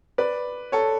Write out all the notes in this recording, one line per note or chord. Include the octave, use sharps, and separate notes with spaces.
B4 D5
A4 C#5